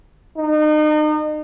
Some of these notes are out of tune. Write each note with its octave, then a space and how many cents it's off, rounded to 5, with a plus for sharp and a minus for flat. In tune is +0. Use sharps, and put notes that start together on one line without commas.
D#4 -35